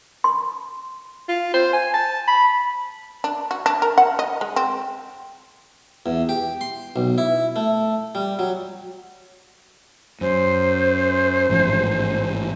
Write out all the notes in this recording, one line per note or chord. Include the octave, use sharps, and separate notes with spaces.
C6
F4
C5
G#5
A5
B5
D4
F#4
D4
A#4
F#5
D#5
G#3
C4
E2
G4
C6
B1
E4
A3
G3
F#3
F#2 C5
A1 G#2 F3